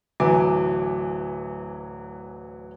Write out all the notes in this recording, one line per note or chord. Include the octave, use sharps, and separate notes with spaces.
D1 E3 F#3 G#5 D6